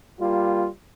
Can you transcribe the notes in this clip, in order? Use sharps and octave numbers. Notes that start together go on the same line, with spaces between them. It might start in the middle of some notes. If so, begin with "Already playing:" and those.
G3 A#3 F4